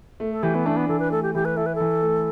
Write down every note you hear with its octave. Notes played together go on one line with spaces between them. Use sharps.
A3
A4
E3 G4
B3
A3 D4
B3
E3 A4
B4
A3 A4
G4
E3 G4
B4
E4 A4
B4
A4
E3
A3